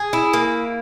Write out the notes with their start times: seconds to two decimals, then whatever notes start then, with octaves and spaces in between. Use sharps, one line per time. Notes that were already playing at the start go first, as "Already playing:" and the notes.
Already playing: G#4
0.13 E4
0.33 A#3